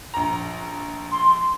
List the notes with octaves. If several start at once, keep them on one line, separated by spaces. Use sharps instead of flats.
A#1 A#5
C6